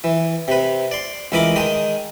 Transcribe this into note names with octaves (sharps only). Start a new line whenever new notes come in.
E3
C3 B4
D5 C6
C#2 E3 A#4 D#5 B5 D6
D#3 G#3 D#4 D#6